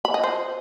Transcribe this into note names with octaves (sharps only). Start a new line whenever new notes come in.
B5
D#5
C5